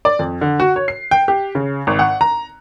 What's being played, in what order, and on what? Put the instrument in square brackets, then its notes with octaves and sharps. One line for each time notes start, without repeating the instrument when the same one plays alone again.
[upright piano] D5
F2
D3
F#4
C#5
C7
G5
G4
C#3
G#1
F#5
A#5